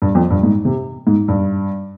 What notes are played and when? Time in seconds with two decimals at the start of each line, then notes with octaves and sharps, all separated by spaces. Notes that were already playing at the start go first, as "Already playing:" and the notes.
0.02 G2
0.15 F2
0.30 G2
0.43 G#2
0.65 C3
1.07 G#2
1.28 G2